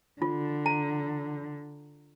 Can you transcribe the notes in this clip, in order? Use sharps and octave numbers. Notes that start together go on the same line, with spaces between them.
D3 F4
A#5